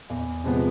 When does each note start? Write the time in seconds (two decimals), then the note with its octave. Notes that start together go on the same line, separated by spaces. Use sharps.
0.10 E2
0.44 C3 F3 G#3 B3